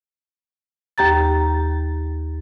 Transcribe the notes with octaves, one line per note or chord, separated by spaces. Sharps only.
D#2 G4 A#5 A6